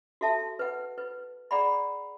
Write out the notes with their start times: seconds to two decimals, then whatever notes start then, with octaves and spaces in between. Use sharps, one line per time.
0.21 F#4 A4 E5 A5
0.59 B4 F#5
0.98 B4
1.51 G#4 D5 F#5 A#5 B5